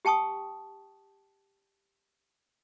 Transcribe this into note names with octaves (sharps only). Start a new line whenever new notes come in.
G4 G5 A5 C#6 D#6